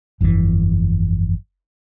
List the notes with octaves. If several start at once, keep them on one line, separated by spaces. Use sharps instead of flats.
G1 F2 G#2 E3